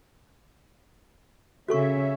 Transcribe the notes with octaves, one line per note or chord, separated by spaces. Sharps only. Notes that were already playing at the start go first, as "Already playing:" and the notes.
C#3 C#4 F#4 A4 E5 C#6